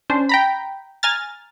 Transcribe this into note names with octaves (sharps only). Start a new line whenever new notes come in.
C#4 D4 C5
G5 A#5 B5
G#5 A#5 F6 A6